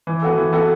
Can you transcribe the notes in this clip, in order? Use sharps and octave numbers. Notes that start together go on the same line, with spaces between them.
E3
B3 F#4 A4
E3
B3 F#4 A4